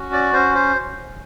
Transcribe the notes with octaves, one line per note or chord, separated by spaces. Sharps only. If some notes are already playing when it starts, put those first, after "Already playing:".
Already playing: C#4 F#4
D5
C#4 C5
C5